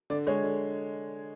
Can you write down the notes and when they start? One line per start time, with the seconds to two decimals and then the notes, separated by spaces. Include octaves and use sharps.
0.10 D3 D5
0.27 G#3 C#5
0.44 D3